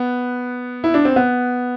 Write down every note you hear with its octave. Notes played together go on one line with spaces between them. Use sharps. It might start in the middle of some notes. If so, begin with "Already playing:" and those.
Already playing: B3
E4
D4
C4
B3